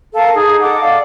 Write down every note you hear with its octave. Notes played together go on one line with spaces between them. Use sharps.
A4 A#4 F5 A5
D#4 G#4
A4 D#5 F#5 D6
D5 F5